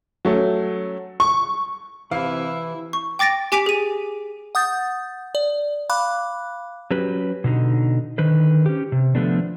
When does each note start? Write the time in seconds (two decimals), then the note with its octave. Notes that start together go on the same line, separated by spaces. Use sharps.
0.25 F#3 A3 C#4
1.20 C#6
2.11 C3 E3 E4 F5
2.93 C#6
3.19 G5 D6 A6 A#6 D7
3.52 G4 G#5 D6 B6 D7 F7
3.66 G#4 D#7
4.55 F#5 D#6 G6 A6
5.35 D5
5.89 F5 B5 D6 F#6
6.91 F#3 C#4 G4 B4
7.44 B2 D3 D#4
8.18 D3 D#3 B4 C5
8.66 C#4 G4
8.92 C3
9.15 D3 F3 A3 B3 D4